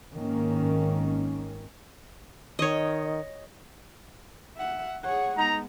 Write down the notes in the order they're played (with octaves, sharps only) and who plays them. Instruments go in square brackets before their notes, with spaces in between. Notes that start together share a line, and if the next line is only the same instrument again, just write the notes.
[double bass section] G#1 D#3 A#3 C#4
[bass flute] D#3 [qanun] C#5 D#5
[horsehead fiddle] E5 F#5
[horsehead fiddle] G#4 C#5 [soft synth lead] F#5
[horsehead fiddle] G#3 B3 [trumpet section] D#4 A#5